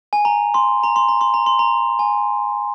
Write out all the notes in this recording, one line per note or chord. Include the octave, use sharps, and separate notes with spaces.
G#5
A#5
C6
A#5
C6
A#5
C6
A#5
C6
A#5
G#5